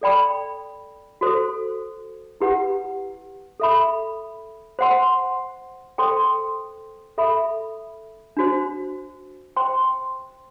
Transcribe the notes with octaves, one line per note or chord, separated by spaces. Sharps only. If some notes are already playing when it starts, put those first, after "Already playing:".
A4 D5 G5 B5
F#4 A4 C5
E4 G4 B4 F#5
A4 E5 B5
C5 F#5 C6
A4 C5 G5 C6
A4 E5 B5
D4 F#4 C5
C5 G5 C6